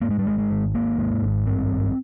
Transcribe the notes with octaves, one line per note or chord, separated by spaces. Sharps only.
G#2 A#3
G#3
G3
G#1 G#3
G#3
G#1
G#2 A#3
G#2
G#1
G2 C4
G#1